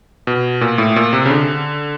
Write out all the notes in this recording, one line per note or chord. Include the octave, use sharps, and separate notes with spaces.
B2
A#2
A2
A#2
C3
C#3
D3